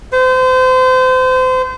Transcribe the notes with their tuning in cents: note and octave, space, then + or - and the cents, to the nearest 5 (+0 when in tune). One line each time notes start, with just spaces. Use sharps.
C5 -35